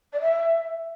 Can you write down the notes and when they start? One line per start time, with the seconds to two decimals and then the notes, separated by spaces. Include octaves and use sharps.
0.12 D5
0.20 E5